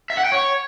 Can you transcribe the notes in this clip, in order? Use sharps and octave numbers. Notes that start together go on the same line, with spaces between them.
E5
F#5
G5
C#5